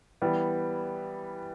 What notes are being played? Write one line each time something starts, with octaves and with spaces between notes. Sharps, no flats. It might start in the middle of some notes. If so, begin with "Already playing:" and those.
E3 G3 B3